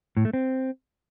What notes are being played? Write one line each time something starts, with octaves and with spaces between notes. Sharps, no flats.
A2
A3
C4